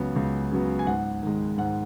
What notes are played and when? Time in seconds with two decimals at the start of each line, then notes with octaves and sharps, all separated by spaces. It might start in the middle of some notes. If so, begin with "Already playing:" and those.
Already playing: C#2 C#3 F#3 B3 C#5
0.16 C#2
0.51 C#3 F#3 B3
0.79 G#5
0.87 G#2 F#5
1.23 D#3 G#3
1.58 G#2 F#5